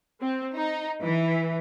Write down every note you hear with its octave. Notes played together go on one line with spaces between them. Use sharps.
C4
D#4
E3